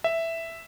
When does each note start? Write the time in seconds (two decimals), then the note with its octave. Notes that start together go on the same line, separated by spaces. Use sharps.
0.04 E5